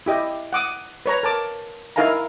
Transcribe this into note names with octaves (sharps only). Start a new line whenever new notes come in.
E4 G4 D#5
F#5 D6 D#6
B4 C#5 A#5
A#4 A5 D6
D#4 E4 A#4 F5 G#5 A#5